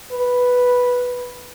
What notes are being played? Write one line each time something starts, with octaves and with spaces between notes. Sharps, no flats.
B4